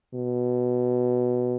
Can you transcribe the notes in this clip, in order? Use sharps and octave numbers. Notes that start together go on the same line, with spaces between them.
B2